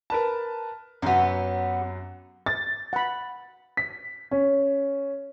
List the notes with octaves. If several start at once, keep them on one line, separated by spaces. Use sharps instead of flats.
A#4 B4 A5
F#2 F#3 B3 G4
A6
F#5 B5
B6
C#4